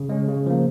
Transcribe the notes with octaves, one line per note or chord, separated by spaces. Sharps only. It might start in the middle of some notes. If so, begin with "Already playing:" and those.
Already playing: C#3
G#3 C#4
C#3
F3 A#3